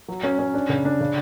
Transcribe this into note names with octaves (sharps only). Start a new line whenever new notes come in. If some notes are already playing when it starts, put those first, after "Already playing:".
F#3
C#4
C#4
D4
C#3
D4
C#3